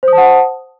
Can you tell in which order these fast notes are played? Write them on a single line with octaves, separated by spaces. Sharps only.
C5 D#6 A5 F#5